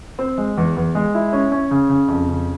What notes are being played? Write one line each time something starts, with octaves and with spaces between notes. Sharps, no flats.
C4
G#3
E2
E2
G#3
E4
C#4
C#4
C#3
C#3
F2
C#3